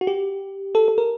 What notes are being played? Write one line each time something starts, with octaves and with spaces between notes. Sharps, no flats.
F#4
G4
A4
A4
A#4